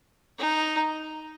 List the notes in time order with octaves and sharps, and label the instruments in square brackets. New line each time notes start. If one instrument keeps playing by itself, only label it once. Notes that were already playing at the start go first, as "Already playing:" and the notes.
[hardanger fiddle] D#4